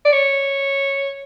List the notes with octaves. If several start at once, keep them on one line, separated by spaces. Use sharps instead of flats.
D5
C#5